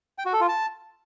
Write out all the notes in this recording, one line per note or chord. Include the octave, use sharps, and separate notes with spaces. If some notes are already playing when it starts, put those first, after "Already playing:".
G5
F#4
A4
F4
A5